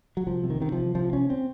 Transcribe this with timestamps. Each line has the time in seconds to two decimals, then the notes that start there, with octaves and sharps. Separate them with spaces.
0.17 F#3
0.27 C2 F3
0.44 C3
0.50 D#3
0.60 C3 D#3
0.72 F3
0.78 C2
0.95 C3 F3
1.13 C2 C#4
1.30 C4